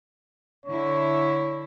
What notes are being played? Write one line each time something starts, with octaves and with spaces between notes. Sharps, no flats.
D3 E4 C#5